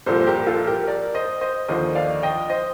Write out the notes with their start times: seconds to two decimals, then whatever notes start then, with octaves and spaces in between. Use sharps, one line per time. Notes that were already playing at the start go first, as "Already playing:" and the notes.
0.06 C2 A#2 F3 A4 C5
0.21 C5
0.27 G4 A#4
0.47 F4 A4
0.67 G4 A#4
0.87 A#4 D5
1.14 C5 D#5
1.41 C5 D#5
1.68 D#2 D3 F3 C5 D#5
1.95 D5 F5
2.23 D#5 G5
2.50 C5 D#5